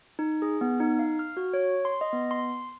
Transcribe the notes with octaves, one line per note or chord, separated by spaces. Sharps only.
D#4
G#4
B3
D#4
F5
F6
F#4
C#5
C6
D#5
B3
C6